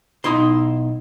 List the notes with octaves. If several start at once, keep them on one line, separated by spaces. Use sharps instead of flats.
B1 D#4 E4 C6